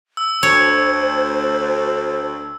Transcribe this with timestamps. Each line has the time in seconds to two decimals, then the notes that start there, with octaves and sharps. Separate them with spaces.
0.17 E6
0.43 D2 C5 C#5